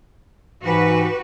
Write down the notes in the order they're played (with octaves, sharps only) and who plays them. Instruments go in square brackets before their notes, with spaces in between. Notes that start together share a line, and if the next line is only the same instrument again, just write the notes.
[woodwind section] G#2 E3 [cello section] F#4 G4 B4